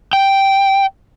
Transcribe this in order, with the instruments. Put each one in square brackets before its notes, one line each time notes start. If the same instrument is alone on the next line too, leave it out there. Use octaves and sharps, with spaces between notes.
[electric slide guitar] G5